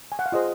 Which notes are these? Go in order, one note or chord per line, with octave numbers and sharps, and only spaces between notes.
G#5
F#5
F5
F4 G#4 C5 D#5